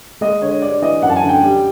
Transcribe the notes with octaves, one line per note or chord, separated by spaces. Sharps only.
G#3 D#5
D3 C#5
G2 D5
E3 D#5
F#2 F#5
A5
G#5
D3
G5
G3